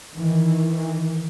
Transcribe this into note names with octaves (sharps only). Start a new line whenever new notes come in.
D#3 E3